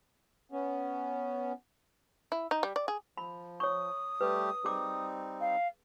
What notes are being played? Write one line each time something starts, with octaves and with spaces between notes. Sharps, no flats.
B3 C#4
E4
D#4
G3
D5
G#4
F3 B5
C#5 C#6 D#6
G3 A3 G4 B4
G3 C4 D#4 G#4 D6
F5